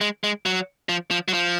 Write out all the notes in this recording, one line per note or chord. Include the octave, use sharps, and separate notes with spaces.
G#3
G#3
F#3
F3
F3
F#3
F3